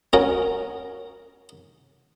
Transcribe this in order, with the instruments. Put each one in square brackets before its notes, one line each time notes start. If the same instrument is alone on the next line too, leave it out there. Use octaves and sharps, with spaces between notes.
[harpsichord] C#4 F#4 A#4